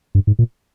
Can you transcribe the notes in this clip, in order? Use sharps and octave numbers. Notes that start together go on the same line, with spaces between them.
G2
G#2
A#2